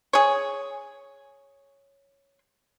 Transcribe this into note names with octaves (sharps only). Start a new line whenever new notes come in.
G#4 C#5